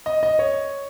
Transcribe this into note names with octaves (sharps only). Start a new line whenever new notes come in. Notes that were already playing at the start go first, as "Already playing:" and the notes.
D#5
D#5
C#5